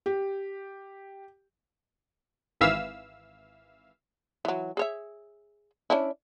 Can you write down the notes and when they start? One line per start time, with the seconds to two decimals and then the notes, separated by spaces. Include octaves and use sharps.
0.06 G4
2.61 G#1 E3 E5 F5 E6
4.45 E3 F#3
4.77 G#4 C#5 E5
5.90 C#4 D4 E4